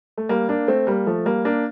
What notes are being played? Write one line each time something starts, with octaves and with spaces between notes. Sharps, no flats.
A3
G3 A#3
A#3 D4
A3 C4
G3 A#3
F3 A3
G3 A#3
A#3 D4